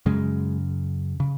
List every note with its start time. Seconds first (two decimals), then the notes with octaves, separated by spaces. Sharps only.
0.06 F#2 C#3 G#3
1.20 C#3